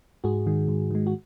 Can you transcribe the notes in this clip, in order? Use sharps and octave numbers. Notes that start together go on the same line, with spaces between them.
G#2 F#4 G#4
D#3 G#3
G#2
D#3 G#3
F#4